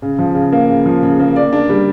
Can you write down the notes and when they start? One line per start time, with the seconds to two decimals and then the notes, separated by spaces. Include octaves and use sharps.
0.02 C#3
0.19 F3
0.35 C#3
0.52 A#3
0.69 C#3
0.86 F3
1.03 C#3
1.20 A#3
1.36 D5
1.53 D4
1.69 G3